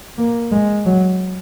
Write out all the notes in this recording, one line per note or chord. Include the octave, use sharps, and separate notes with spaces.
A#3
G#3
F#3